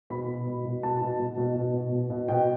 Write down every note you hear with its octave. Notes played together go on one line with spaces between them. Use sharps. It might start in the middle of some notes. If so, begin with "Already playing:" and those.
B2 B5
B2
B2
B2
B2 A5
B2
B2
B2
B2
B2
B2
B2
B2 G5